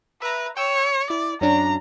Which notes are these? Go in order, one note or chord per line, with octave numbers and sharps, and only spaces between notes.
B4 E5 A#5
C#5 G5 E6
E4 D5
F#2 C#4 D4 A#5